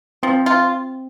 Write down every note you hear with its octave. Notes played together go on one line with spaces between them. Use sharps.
F3 C4
F4